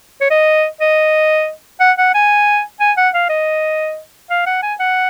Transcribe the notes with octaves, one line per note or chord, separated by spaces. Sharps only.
C#5
D#5
D#5
F#5
F#5
G#5
G#5
F#5
F5
D#5
F5
F#5
G#5
F#5